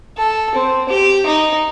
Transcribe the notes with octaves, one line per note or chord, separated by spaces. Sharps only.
A4
C4
G4
D#4